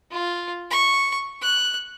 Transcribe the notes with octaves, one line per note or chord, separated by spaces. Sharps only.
F4
C#6
F#6